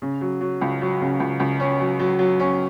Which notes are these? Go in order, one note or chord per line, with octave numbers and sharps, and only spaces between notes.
C#3
F#3
F#3
C#2
F#3
C#3
C#2
C#2
C#4
F#3
F#3
F#3
C#4